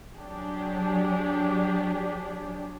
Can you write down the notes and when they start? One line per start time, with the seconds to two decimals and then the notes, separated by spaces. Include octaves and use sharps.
0.16 F#3 D4 G4 G#4